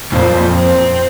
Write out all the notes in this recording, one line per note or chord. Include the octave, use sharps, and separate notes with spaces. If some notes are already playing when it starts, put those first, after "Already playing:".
C2 F2 A#2 C5
C4